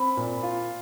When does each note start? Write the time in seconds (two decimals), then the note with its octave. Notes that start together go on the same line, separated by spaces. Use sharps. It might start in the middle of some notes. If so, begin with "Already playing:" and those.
Already playing: C4 B5
0.17 A#2
0.43 F4